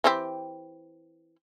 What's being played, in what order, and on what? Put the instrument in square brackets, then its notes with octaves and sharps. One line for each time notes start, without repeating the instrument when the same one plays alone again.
[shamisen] E3 C4 G4